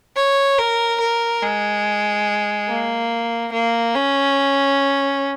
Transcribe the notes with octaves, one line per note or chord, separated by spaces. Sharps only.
C#5
A#4
A#4
G#3
A#3
A#3
C#4